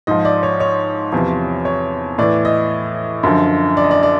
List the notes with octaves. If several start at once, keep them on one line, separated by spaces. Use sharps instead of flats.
G#2 F3 D#5
D5
C#5
C#5
E2 C3 F3
C#5
A2 E3 D5
D#5
F#2 D3 F3
D5
D#5
D5
D5